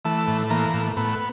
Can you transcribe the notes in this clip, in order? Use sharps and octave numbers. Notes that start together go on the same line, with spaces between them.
E3 A3
A2
E3 A#3
A2
A2 B3